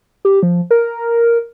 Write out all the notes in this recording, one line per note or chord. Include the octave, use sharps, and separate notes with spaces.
G4
F3
A#4